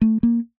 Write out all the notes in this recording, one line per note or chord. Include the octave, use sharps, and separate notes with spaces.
A3
A#3